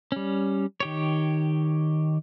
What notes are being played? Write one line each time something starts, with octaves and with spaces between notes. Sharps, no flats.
G3 C#4
D#3 G4 C#5